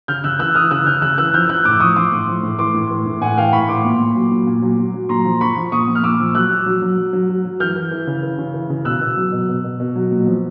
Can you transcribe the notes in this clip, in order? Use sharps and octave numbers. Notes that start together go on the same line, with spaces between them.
C#3 F6 G6
C#3 E6 F#6
E3 E6 F#6
E3 D#6 F6
C#3 E6 F#6
C#3 F6 G6
C#3 E6 F#6
E3 E6 F#6
F3 F6 G6
F3 E6 F#6
A2 D6 E6
F3 C#6 D#6
F3 C6 D6
A2
F3
A2
E3 C6 D6
A2
E3
A2
A2 F#5 G#5
E3 F5 G5
A2 B5 C#6
A2 C6 D6
A#2
A#2
F#3
A#2
A#2
F#3
F#3
F#3
A#2 A#5 C6
F3
F3 B5 C#6
F3
A#2 C#6 D#6
A#2
F6
A#2 D6 E6
F3
F#3 E6 F#6
F#3
F#3
F#3
F#3
F#3
F#3
F#3
E3 F6 G6
E3
E3
C#3
E3
C#3
E3
C#3
B2 E6 F#6
B2
F#3
B2
B2
B2
B2
F#3
A#2
F3